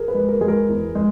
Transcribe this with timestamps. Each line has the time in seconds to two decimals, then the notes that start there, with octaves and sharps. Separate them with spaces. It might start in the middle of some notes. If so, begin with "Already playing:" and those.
Already playing: G#4 A#4
0.08 B4
0.15 G#3
0.29 A#4
0.41 G#3 G#4
0.48 A#4
0.69 E2
0.95 G#3